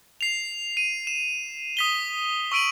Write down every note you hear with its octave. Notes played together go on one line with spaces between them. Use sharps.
C7 F7
D#7
E7
D#6 B6 G7
C#6 E6 D7 D#7 F#7